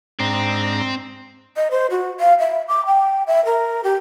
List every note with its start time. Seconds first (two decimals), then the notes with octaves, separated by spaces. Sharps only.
0.20 G#2 C4 D4 A#5
1.56 D#5
1.71 C5
1.91 F#4
2.20 F5
2.39 E5
2.68 D6
2.86 G5
3.27 E5
3.45 A#4
3.84 G4